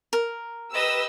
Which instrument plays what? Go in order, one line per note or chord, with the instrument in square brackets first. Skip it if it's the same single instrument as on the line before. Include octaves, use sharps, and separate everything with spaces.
[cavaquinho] A#4
[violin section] G4 B4 E6 [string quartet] D#5